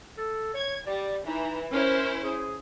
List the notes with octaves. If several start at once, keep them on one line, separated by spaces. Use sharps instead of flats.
A4
C#5 G#6
G3 D5
E3 D#4
C#4 E4 A#4 C5
G#4